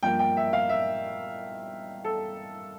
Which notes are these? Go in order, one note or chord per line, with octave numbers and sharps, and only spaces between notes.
G2 F3 A#3 G5
G5
E5
F5
E5
A4